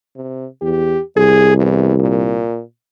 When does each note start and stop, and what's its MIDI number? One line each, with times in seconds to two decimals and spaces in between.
0.16 0.46 48
0.62 0.97 40
0.62 1.01 67
1.17 2.46 36
1.17 1.54 68
1.58 1.99 40
1.99 2.61 46